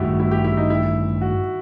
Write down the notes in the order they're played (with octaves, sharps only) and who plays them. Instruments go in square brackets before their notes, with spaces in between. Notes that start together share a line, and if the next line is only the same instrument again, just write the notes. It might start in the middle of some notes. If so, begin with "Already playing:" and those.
Already playing: [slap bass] A1 G2 D#3 A3 [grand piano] E4 F#4 G4
[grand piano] E4
G4
E4
D#4
E4
F#4